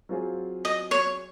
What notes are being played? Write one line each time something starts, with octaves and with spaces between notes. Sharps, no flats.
F#3 C4 F4 G#4
D#5
C#5